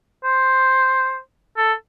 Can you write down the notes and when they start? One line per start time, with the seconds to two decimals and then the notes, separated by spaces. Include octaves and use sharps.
0.24 C5
1.57 A4